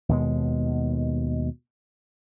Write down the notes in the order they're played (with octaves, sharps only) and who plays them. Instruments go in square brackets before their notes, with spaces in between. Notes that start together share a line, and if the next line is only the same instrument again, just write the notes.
[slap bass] D#2 B2 G#3